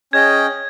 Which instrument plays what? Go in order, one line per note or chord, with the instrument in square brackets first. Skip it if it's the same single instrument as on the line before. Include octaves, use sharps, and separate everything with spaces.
[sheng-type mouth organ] C#4 G#4 D#5 G5 [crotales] G#6